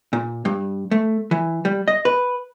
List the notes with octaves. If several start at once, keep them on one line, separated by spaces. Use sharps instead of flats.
A#2
G2
A3
E3
G3
D#5
B4